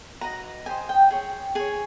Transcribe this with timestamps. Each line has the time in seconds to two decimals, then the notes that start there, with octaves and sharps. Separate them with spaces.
0.21 F#4 B4 D#5 A#5
0.66 G4 C5 D#5 G#5
0.89 G5
1.11 G#4 C#5
1.55 G#4 C#5 G#5